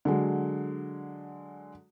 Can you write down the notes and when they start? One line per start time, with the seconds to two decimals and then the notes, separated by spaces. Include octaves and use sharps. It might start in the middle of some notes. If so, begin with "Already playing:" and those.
0.05 D3 F#3 G#3